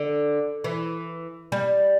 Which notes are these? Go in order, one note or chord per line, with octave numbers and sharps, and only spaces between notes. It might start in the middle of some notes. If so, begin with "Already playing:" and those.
Already playing: D3
E3
G3